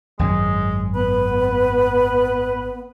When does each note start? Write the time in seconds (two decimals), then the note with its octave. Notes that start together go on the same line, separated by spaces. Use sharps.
0.19 G#1 F#2 F#3 G#3
0.95 B3 B4